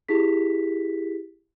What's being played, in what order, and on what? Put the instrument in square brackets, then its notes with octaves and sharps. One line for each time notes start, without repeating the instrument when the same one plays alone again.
[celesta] E4 G4 G#4 B6